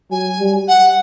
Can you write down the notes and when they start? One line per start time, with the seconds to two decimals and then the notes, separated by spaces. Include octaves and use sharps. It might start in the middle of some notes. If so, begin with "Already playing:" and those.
0.11 F#3 G#5
0.39 G3
0.67 F#5